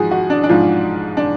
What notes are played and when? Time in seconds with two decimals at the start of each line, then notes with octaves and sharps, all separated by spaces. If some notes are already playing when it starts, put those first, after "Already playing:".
Already playing: G#2 F3 F#4 G#4
0.11 F#4
0.30 D4
0.44 D4
0.49 G#2 F3 F4
1.17 D4